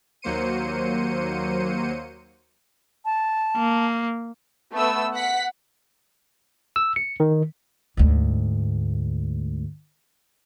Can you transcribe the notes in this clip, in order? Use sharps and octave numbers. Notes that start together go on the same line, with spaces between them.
D#2 F#3 A#3 C5 C#7 D#7
A5
A#3
A3 B3 E6
F#5 B6
E6
C#7
D#3
D2 G#2